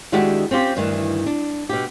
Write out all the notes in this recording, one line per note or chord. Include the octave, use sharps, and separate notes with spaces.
D#3 G#3 D4 E4 F#4 G4
C4 C#4 F4 G4
D2 G2 D#3 E3
D4
B2 G4